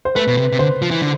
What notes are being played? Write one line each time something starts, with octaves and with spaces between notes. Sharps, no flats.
C5
A3 B4
B2
C3
C3
D3 C5
F3
E3
D3